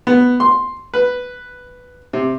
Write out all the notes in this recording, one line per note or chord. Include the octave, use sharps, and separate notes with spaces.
B3
C6
B4
C3